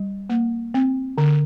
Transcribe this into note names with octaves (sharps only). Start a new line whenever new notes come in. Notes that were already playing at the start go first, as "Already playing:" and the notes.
Already playing: G3
A#3
C4
D3